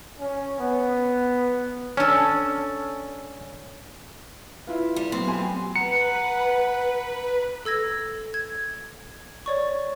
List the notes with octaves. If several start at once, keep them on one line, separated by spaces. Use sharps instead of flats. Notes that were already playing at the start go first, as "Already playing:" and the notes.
C#4
B3
C#4 D4 A4
C#4 E4 F4 B4
G3
A2 F#3 B3 C4
G4 G#5 C6
B4 F#5 A#5 C#7
A4 E6 G#6 A#6
G#6
C#5 D5 C#6